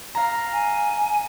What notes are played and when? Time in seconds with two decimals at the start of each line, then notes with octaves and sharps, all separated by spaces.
0.15 F5 A#5
0.52 G#5